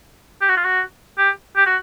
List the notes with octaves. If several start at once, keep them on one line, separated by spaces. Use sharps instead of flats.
G4
F#4
F4
F#4
G4
G4
F#4